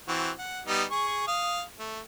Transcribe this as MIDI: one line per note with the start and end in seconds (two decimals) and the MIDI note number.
0.08 0.30 52
0.08 0.30 60
0.08 0.30 66
0.39 0.62 78
0.67 0.84 55
0.67 0.84 59
0.67 0.84 63
0.91 1.24 68
0.91 1.24 85
1.28 1.62 77
1.28 1.62 87
1.79 2.00 57